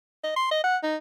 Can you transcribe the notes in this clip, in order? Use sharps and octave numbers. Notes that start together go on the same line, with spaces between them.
D#5
C6
D#5
F#5
D#4